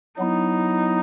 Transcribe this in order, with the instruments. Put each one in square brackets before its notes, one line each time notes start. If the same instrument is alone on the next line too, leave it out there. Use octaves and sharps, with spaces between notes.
[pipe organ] F#3 B3 E4 [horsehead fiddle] D#4